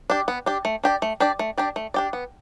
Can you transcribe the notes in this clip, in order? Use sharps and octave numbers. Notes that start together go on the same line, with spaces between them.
D4 G4
B3
D4 G4
A3
D4 G4 D5
A3
D4 G4 D5
A3
D4 G4 D5
A3
D4 G4 D5
B3